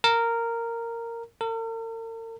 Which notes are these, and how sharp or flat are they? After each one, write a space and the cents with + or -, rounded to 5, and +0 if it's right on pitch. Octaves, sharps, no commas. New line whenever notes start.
A#4 -10
A#4 -45